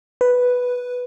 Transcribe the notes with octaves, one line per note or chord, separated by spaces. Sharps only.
B4